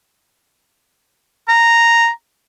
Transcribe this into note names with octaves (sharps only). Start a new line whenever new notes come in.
A#5